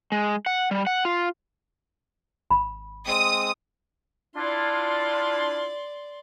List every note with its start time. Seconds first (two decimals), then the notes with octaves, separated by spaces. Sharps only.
0.12 G#3
0.46 F#5
0.71 G3
0.87 F#5
1.05 F4
2.51 G#1 B5
3.07 G#3 C4 D#6
4.36 D4 E4 F4 D5 C6